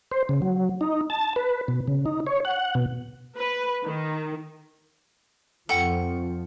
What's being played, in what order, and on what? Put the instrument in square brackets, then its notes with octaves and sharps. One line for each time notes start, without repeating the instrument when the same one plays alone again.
[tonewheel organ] C5
C#3
F#3
D#4
A5
B4
B2
C#3
D#4
C#5
F#5
B2
[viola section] B4
D#3
[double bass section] F2 F3 [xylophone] A4 F#5 G5 [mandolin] C#6